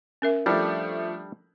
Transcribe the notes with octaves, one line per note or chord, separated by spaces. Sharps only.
C#4 A#4 E5
F3 G3 A3 D4